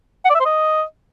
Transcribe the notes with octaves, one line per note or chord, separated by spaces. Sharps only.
F#5
D5
E5
C5
D#5